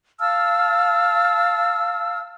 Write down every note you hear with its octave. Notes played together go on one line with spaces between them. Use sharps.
F5 A5 E6 F6